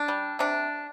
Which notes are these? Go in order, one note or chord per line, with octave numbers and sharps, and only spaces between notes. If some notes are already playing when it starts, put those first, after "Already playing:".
Already playing: D4
G3
C3 D4